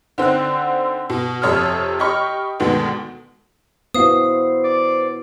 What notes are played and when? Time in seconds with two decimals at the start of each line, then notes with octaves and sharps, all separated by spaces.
0.18 D3 C4 D#4 F#6
1.10 B2
1.42 F2 C3 A4 C#5 D#6 F6
1.99 G4 D#5 B5 C#6 F6
2.59 D2 B2 D#3 G#3 B3
3.94 B3 E4 F#4 C5 F5 D#6
4.64 D5